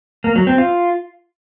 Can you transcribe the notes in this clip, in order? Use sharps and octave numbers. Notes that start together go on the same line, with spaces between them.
A#3
F#3
C4
F4